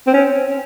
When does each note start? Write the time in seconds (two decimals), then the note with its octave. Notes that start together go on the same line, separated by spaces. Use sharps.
0.07 C4
0.13 C#4